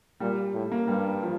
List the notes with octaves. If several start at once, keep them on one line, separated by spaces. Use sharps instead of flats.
A#2 G3
A2
A#3
G2 G3
F3